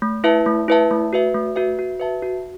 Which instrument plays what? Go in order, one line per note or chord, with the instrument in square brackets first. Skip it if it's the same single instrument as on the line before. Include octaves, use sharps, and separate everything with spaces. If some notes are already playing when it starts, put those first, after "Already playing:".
[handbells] A3
E4 B4 E5 A5
A3
E4 B4 E5 A5
A3
F#4 B4 E5
A3
F#4 B4 E5
F#4
B4 E5 A5
F#4